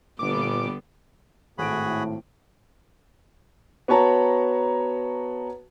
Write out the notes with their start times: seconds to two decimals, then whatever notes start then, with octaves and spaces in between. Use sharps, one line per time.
0.19 G1 A#2 D3 G3 B3 D6
1.58 G#1 A2 F#4 G#4 B5 D7
3.88 B3 F#4 C#5 A5 A#5